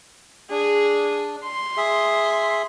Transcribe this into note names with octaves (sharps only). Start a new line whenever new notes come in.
D4 G#4
C6
G#4 E5